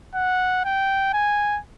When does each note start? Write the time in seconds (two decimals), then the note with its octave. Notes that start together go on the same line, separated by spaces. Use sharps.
0.15 F#5
0.65 G5
1.13 G#5